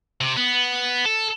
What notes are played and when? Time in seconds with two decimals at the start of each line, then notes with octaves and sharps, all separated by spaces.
0.21 C3
0.37 B3
1.06 A4